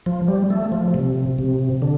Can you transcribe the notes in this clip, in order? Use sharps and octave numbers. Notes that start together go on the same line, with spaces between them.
F3
G3
A3
F3
C3
C3
D3